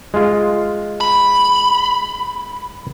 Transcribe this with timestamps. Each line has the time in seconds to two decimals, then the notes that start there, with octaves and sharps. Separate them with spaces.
0.14 G#3 F4
1.01 B5